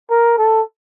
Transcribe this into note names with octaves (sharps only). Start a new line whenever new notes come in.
A#4
A4